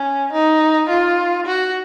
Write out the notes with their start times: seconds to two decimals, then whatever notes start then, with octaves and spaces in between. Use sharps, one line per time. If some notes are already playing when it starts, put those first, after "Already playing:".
Already playing: C#4
0.33 D#4
0.89 F4
1.46 F#4